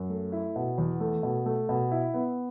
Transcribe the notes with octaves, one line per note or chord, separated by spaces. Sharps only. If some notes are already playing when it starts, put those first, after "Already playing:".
Already playing: F#2
A3
E4
B2
E2
A3
B2
A3
B2
E4
B3